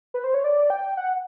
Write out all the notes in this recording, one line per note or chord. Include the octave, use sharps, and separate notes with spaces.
B4
C5
C#5
D5
G5
F#5